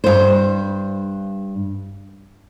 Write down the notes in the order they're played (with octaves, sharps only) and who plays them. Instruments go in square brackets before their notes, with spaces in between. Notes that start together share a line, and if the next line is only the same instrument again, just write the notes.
[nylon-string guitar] G2 C5